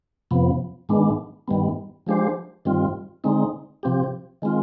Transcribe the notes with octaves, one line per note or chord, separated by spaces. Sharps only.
F2 C3 F3 B3
G#2 D#3 G#3 B3 D4
G2 D#3 G3 B3
F3 G#3 D4 G4 C5
G2 D#3 G3 C4 F4
D3 G#3 C4 D#4
C3 F3 C4 G4
D#3 G#3 C4 F4